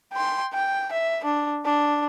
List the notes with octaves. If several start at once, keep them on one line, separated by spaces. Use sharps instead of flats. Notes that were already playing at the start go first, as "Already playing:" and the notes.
G5 C6
G5
E5
D4
D4